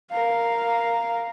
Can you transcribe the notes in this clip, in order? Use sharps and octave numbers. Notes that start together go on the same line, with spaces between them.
A#4 F5